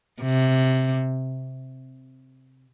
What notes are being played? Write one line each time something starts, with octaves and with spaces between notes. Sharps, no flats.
C3